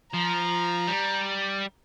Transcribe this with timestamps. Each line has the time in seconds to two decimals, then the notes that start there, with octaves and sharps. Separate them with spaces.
0.13 F3 A#5
0.88 G3